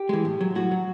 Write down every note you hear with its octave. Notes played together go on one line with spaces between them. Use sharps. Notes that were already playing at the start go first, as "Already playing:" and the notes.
Already playing: G4
E3 G#3
A2
F#3
A2 F#4
F#3